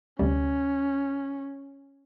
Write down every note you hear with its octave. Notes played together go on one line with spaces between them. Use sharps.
D2 C3 G3 C#4